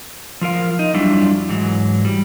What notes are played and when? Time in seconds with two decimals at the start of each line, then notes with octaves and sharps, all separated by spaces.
0.41 F3 F4 A#4 F5
0.79 D#4
0.94 F2 F#3 G3 D4 E4 F4
1.49 G#2 E3 F#3
2.05 G3